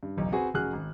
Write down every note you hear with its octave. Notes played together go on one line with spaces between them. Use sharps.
G2
F#1 B1 E2
C4 F#4 G#4 B4 G#5
F1 F#2 F#4 G#4 F6 F#6
G#1